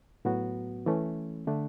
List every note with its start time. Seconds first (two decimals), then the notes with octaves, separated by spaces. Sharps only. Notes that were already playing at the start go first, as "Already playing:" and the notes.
0.25 A2 F#3 B3 F#4
0.86 E3 A3 C#4
1.47 D3 A3 D4